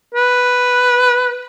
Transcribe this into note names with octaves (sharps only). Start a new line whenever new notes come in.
B4